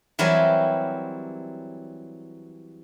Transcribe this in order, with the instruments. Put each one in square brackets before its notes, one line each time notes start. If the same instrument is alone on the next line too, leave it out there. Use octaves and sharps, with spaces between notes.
[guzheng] E3 F#3 G3 C4 A#4 G#5